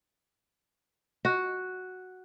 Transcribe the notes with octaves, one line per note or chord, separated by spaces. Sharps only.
F#4